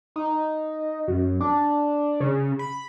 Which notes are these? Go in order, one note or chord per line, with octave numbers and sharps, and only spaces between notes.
D#4
F#2
D4
C#3
B5